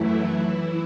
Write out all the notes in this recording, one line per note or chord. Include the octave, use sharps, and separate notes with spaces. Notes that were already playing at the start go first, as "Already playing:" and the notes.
Already playing: F#2 E3 F#3 A3 E4
E3 E4